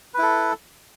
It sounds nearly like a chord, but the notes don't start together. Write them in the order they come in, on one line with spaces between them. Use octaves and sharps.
B4 E4 A4